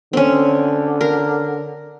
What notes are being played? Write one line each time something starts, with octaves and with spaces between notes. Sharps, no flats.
D3 C4 C#4
A#4